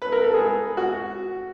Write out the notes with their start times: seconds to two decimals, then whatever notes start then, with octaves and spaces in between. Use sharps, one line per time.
0.02 B4
0.12 A#4
0.23 A4
0.34 G#4
0.77 F#4